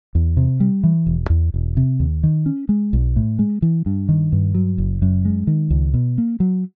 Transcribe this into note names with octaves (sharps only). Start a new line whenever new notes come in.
E2
C3
G3
E3
E1
E2
E1
C3
D#2
D#3
C#4
G#3
B1
A2
G#3
E3
G2
D#3
G2
F#3
F#1
F#2
G#3
D#3
C#2
B2
A#3
F#3